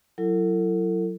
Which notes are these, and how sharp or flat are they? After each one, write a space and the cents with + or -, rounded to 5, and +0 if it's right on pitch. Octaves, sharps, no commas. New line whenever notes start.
F#3 +0 E4 +30 A4 +35